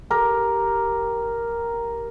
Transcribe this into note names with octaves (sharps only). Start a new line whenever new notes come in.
G4 A#4